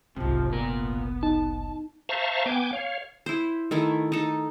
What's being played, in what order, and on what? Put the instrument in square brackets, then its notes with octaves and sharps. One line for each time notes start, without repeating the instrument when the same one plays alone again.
[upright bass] F#1 C2 [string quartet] G#2 F3 [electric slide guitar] C3
[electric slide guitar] A#2 A#4 [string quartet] B3
[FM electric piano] D#4 [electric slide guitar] A5
[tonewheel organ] C5 E5 F5 A5 A#5 C#6
B3 G5 G#5 D6
C#5 F5
[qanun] E4 C5
D#3 A3 E4
D#4 A4